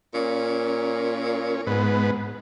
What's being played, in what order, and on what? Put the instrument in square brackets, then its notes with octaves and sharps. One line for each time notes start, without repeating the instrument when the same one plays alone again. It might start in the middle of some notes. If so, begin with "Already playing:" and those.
[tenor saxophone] A#2 [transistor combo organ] C#4
[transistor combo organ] G#2 B3